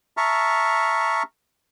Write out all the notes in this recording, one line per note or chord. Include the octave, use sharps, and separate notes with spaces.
E5 A5 A#5 C#6 F6